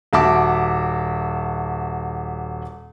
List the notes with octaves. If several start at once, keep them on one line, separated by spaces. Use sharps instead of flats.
D#1 F#4 E5 A5 D6